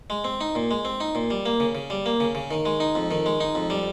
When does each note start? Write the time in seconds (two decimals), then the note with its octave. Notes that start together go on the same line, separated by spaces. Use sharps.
0.10 G#3
0.24 C4
0.41 D#4
0.55 A#2
0.71 G#3
0.85 C4
1.00 D#4
1.15 A#2
1.31 G3
1.46 A#3
1.60 C#3
1.75 C#3
1.90 G3
2.06 A#3
2.20 C#3
2.35 C#3
2.51 D#3
2.65 G#3
2.80 D#4
2.95 F2
3.11 D#3
3.26 G#3
3.40 D#4
3.55 F2
3.70 G3